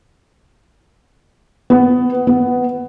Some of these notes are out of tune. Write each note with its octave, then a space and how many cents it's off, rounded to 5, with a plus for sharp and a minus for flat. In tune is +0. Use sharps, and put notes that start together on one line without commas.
B3 +15
B3 +10